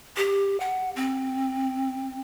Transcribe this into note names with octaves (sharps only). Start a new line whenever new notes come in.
G4
F#5
C4